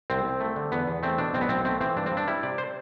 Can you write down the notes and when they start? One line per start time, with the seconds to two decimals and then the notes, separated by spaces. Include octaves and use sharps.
0.10 C2 C4
0.25 C2
0.40 A3
0.56 D3
0.72 E2 B3
0.87 E2
1.03 A3 C4
1.18 B2 D4
1.34 B1 C4
1.41 B3
1.49 B1 C4
1.65 A3 C4
1.81 E3 C4
1.96 G2 D4
2.06 C4
2.11 G2
2.17 D4
2.28 G3 E4
2.43 C3 D5
2.58 C5